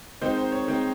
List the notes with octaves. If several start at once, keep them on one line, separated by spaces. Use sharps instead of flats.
D#3 G#3 C4 D#4 C5
C5
C#5
D#3 G#3 C4 D#4